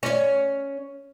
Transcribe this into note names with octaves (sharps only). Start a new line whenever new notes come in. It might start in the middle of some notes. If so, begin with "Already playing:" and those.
C#4 C#5